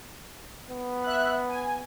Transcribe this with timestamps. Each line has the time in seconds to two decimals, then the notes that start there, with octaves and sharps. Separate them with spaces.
0.70 B3
1.04 E5 F#6
1.49 G#5